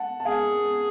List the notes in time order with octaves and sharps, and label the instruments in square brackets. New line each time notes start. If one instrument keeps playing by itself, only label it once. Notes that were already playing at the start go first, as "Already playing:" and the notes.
Already playing: [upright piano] F#5 A5
A5
[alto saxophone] G#4 [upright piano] F5 G#5